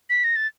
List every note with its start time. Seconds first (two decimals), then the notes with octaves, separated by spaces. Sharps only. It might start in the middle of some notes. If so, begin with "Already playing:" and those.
0.10 B6
0.24 A#6
0.36 A6